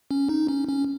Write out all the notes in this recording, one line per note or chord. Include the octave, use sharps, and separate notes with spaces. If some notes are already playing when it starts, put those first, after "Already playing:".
C#4
D#4
C#4
C#4